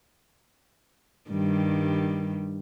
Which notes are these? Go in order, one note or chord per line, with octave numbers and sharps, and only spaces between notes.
G2 D#3 G3